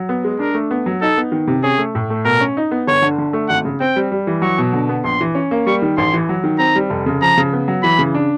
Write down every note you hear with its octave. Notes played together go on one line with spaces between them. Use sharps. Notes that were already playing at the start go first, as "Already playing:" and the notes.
Already playing: F#3
B3
G#3
D4 A#4
A3
B3
F#3
D#4 A4
B3
D#3
C3
C#4 G#4
A3
A2
A3
B2 A#4
C#4
D#4
B3
G1 C#5
D3
D3
A3
G#1 F#5
C#3
C4 G5
G3
G3
E3
F#3 C#6
B2
D3
B3
A#1 C6
E3
C#4
A#3
G3 C#6
D#3
A1 C6
E3
F#3
D#3
C4 A#5
G3
F1
C#3
F3 A#5
C#3
B3
F#3
E3 B5
C#3
D4